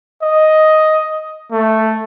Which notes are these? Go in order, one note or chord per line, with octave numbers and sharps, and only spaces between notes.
D#5
A3